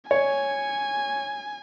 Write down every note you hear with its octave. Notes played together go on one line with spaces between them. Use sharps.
C#5 G#5